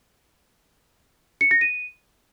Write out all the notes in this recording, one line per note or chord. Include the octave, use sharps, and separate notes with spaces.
C#7
A#6
D#7